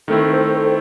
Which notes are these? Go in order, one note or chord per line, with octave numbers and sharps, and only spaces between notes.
D#3 A3 C4 E4 A4
C5
A4